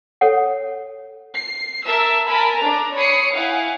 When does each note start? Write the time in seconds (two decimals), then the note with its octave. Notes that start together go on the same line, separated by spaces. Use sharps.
0.21 A4 C#5 F#5
1.36 C7
1.86 A#4 E5 A5 E6
2.28 A#4 G#5 A5 B5
2.59 D4 A#5
2.95 C#5 B5 D#6 C7 C#7
3.34 E4 F5 F#5 G#5